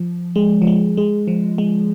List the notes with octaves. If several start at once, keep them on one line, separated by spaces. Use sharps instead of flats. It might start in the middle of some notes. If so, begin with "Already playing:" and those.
Already playing: F3
G#3
F3
G#3
G#3
F3
G#3